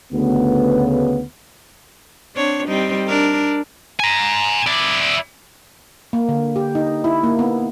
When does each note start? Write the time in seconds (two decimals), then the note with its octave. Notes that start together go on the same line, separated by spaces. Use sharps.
0.13 D2 C#3 B3
2.35 C4 D4 C#5
2.66 G3 C4 D#4
3.08 D4 A#4
4.00 G#5 A#5
4.67 E4 D5
6.13 A#3
6.29 D3
6.56 G4
6.75 D#4
7.04 E4
7.24 A#3
7.39 B3